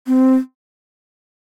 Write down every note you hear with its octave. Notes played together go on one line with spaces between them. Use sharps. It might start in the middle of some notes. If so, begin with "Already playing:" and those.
C4